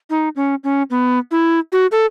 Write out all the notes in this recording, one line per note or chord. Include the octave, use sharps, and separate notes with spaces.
D#4
C#4
C#4
B3
E4
F#4
A4